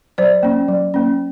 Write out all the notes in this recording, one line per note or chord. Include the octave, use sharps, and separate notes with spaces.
F#3 C5 D5
A#3 C#4
F#3
A#3 C#4